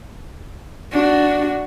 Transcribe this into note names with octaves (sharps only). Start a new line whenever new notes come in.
D4 F#4